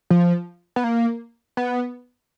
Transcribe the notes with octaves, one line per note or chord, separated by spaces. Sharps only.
F3
B3
A#3
B3